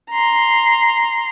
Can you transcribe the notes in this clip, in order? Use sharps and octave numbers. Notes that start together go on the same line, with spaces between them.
A#5 C6